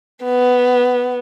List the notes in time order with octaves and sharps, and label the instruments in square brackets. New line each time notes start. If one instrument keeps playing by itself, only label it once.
[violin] B3